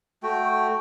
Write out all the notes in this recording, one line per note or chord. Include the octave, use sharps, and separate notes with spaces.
A3 F#4 G5